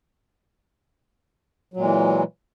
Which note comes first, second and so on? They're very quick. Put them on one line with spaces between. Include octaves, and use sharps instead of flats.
F#3 A#2 G#3 E3